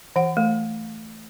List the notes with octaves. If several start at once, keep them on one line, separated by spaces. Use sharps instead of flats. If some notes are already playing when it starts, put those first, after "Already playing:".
E3 F#5
A3